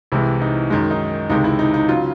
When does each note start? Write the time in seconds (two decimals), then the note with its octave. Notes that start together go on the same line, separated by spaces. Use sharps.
0.12 C2 C3 E3 G#3 E4
0.41 D#4
0.70 F#2 D#3 G#3
0.91 D#4
1.30 C#2 C3 D#3 G#3 D#4
1.44 E4
1.59 D#4
1.74 D#4
1.89 C#3 F#3 F4